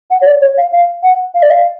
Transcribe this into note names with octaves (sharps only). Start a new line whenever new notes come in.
F#5
C#5
D5
C#5
F5
F5
F#5
F5
D5
F5